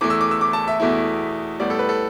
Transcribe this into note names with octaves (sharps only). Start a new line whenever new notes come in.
E2 E3 A3 D6
E6
D6
E6
D6
A5
E5
E2 B2 A3 E4
A2 G3 B3 D5
A4
B4
A4